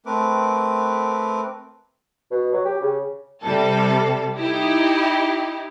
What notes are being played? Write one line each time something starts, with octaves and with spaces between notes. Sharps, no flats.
A3 C4 A#4 B4 D6
B2
F#3
G4
C#3
C3 G3 A4
D#4 E4 G4